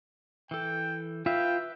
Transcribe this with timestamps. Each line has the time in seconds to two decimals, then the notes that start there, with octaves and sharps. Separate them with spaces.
0.51 E3 A4 G5
1.26 F4 B4 E5 G5